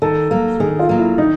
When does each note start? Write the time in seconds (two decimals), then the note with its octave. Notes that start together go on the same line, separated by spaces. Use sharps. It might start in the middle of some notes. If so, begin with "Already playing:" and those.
0.02 D#3 A4
0.31 F#3 A#3
0.60 D#3 G#4
0.79 F4
0.89 F#3 A#3
0.98 E4
1.18 D#3 D#4